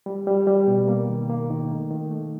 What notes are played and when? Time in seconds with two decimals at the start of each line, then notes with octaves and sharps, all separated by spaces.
0.06 G3
0.27 G3
0.47 G3
0.67 B2
0.88 A#3
1.08 D#3
1.30 A#3
1.50 D#3
1.71 A3
1.91 D#3
2.11 A3